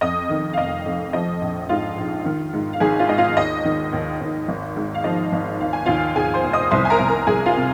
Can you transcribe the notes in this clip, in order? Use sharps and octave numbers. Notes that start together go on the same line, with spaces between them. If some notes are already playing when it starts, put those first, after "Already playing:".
F2 D#5 D#6
D#3
F5
F1 D#5
F2
F3 D#5
A#1
G#2 F4 F5
A#1
D#3
G#2
F5
G#1 G#4 G#5
F4 F5
G#2 D#5
F4 F5
D#2 D#5
D#3
D#2
D#2
G#1
G#2
F5
F3 D#5
G#1
D#2 F5
G#5
D#2 F4 F5
D#2 G#4 G#5
C5 C6
F1
D#5 D#6
C2 C5 C6
G#5
A#4 A#5
C2
A#4 A#5
C2 G#4 G#5
F4 F5
C3